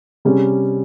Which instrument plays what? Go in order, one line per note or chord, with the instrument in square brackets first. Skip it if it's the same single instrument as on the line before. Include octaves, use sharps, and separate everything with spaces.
[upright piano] C3 G3 C#4 G#4